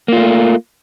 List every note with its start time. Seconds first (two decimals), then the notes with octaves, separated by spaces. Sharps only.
0.08 A#3
0.13 F4
0.17 A3